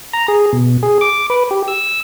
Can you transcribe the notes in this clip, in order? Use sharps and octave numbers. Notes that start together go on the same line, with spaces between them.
A#5
G#4
B2
G#4
D6
B4
G4
E6